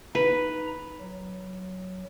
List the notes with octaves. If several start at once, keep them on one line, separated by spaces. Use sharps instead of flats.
D#4 B4 A#5
F#3